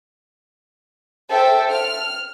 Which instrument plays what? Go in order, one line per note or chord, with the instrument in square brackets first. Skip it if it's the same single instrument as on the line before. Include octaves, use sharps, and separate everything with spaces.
[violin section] A4 C5 E5 G5
F6